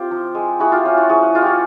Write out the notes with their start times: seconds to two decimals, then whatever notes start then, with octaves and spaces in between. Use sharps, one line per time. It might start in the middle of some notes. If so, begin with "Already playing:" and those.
Already playing: C4 F4 G4
0.11 F3
0.35 G#3
0.60 E4 F#4 G#4
0.72 F4 G4
0.85 C#4 F4
0.97 F#4
1.09 F3 F#4 G#4
1.23 F#4
1.35 G#3 F4
1.42 F#4 G4